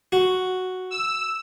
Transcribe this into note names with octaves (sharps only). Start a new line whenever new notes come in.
F#4
E6